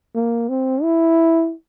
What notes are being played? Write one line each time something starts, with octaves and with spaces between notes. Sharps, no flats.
A#3
C4
E4